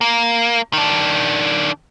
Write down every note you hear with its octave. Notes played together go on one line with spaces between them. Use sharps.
A#3
D#3 D4